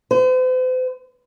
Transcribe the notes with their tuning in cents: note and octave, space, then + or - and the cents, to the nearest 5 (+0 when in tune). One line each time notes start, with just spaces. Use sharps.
C5 -45